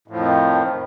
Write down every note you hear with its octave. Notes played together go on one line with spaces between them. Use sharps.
F2 A2 D#3 F3